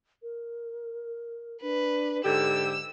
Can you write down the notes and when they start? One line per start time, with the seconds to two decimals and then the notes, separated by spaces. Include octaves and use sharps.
0.22 A#4
1.62 D4 B4
2.25 G#2 D3 G4 A4 E6